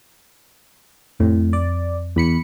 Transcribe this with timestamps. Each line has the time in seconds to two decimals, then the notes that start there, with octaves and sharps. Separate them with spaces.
1.20 F2 A2 C4
1.53 D5
2.16 E2 B5 C#7